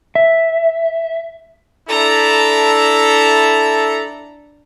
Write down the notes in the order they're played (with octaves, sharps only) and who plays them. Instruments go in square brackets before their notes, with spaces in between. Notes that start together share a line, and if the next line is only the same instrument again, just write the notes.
[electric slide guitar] E5
[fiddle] D4 A#5 [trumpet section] E4 A4